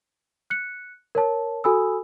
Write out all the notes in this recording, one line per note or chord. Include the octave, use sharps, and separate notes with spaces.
F#6 C#7
A#4 C#5 A5
F#4 A4 G#5 B5 D#6 E6